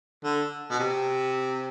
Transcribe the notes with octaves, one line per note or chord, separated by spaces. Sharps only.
D3
B2
C3